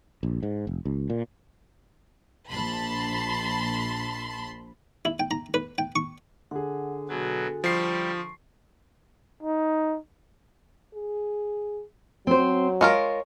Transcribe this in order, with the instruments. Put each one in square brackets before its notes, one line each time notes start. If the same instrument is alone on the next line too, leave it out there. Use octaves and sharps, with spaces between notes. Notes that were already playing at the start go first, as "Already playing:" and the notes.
[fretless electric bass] A#1
G#2
F1
C#2
A#2
[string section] A#1 A5 B5 C6
[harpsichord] E4
G5
A#5
B4
G5
C#6
[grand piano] D3 G#4 [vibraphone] F#5
[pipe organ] B2 F#3 [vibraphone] F#4 A4 G#5
[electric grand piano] F3 C7 [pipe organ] G3 [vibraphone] C6 C#6
[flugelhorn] D#4
[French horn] G#4
[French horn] F#3 [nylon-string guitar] C4 C5
[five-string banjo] G#3 F4 A#4 [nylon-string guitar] C#5